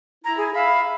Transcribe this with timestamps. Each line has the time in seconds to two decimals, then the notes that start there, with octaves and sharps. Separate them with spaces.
0.24 E4 A#5
0.37 G#4
0.54 E5 F5 B5